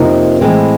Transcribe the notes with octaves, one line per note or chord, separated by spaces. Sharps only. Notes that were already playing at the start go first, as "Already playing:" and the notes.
Already playing: F2 C3 F3 A#3 D#4
A2 E3 G#3 C4